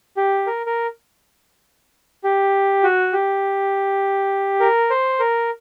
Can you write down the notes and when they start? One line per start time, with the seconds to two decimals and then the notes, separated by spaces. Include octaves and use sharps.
0.17 G4
0.47 A#4
0.66 A#4
2.24 G4
2.83 F#4
3.13 G4
4.60 A#4
4.90 C5
5.19 A#4